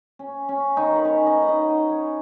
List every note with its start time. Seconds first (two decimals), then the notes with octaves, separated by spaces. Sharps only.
0.19 C#4
0.49 C#4
0.77 D#3 D#4
0.96 B4
1.05 C#4 C#5
1.26 D#4 D#5
1.42 F#5
1.48 D#4 D#5
1.69 D#4 D#5
1.90 C#4 C#5